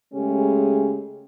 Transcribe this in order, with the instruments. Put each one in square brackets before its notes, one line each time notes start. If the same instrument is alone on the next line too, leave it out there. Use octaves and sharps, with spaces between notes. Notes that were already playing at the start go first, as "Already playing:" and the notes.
[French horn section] C#3 G#3 A3 C#4 G4 G#4